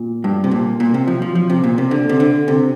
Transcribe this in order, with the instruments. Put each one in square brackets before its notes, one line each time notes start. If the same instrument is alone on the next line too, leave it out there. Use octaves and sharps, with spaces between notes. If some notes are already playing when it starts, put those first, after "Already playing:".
Already playing: [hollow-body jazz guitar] A#2
G2
C3
A#2
A#2
C3
F3
F3
F3
C3
A#2
C3
D3
C3
D3
C3